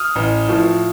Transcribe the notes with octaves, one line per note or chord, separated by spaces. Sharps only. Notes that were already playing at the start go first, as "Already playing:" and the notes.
Already playing: D#6 F6
A1
A2 F3